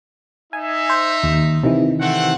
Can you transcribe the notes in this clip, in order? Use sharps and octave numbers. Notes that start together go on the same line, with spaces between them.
D#4 E5 G#5
C5
D#2
C3 D#3 E3
A3 C4 F#5